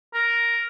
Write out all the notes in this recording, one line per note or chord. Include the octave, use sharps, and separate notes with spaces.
A#4